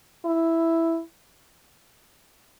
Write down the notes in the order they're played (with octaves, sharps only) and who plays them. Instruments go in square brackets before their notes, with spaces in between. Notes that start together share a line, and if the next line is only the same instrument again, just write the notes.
[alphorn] E4